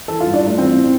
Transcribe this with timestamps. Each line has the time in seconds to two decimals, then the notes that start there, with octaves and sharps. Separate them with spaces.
0.08 E3 A4
0.20 F4
0.26 G2
0.34 D4
0.41 G2
0.47 A3
0.58 E3 C4
0.76 A2